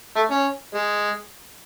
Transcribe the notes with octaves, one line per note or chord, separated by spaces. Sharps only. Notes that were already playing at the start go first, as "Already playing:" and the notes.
A3
C#4
G#3